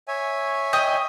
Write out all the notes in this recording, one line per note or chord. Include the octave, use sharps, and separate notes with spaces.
C#5 E5 G#5
D#5 G5 D#6